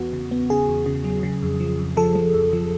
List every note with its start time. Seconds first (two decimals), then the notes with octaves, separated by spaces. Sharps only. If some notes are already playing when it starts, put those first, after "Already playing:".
Already playing: E2 B3 F#4
0.13 C#3
0.31 B3
0.50 C#3 G#4
0.68 E2
0.86 C#3
1.04 F#3
1.23 C#3
1.43 F2
1.60 F3
1.79 F2
1.97 F3 A4
2.15 F3
2.34 F2
2.53 F3